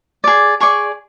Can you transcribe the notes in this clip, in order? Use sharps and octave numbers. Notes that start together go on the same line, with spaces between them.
G#4 D5
G#4 D5 C#6